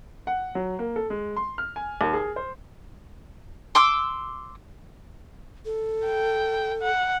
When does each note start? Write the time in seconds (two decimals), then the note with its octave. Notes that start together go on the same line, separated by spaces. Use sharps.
0.27 F#5
0.55 F#3
0.79 A#3
0.96 A4
1.10 G#3
1.37 C6
1.58 F6
1.76 G#5
2.01 D#2
2.13 G#4
2.36 C5
3.75 C6 D6 E6
5.65 A4
6.05 G5
6.82 F#5